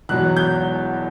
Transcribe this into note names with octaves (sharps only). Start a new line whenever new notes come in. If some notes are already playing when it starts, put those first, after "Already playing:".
E2 B2 F#3 F#6
G6